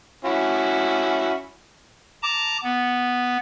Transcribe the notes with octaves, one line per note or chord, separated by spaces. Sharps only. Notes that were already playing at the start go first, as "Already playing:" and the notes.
C#4 E4 F#4
A5 A#5 D6
B3